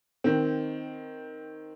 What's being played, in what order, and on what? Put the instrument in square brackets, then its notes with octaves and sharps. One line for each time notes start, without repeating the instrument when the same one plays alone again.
[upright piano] D#3 C4